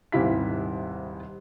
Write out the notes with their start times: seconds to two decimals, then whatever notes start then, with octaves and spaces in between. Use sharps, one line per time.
0.12 D#1 G#2 C3 E4 F5 B6